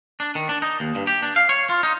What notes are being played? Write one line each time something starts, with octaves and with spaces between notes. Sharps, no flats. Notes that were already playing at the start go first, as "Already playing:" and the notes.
D4
D#3
D4
D#4
D#2
G2
G4
D4
F5
C#5
F4
D#4